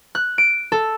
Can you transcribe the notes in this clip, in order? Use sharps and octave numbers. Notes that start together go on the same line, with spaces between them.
F#6
D7
A4